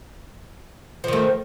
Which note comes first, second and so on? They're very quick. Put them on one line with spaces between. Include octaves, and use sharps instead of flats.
F3 D#3 A3